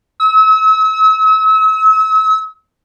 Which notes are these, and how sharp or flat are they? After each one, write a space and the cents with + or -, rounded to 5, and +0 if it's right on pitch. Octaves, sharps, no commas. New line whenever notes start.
E6 -40